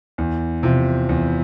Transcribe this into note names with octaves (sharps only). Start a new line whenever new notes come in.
E2
C3 F3
E2